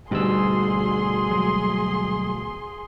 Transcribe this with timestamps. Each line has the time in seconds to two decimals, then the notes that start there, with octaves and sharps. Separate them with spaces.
0.11 D2 G#2 B2 G3 G#4 C6 E6
1.31 F#3 G#3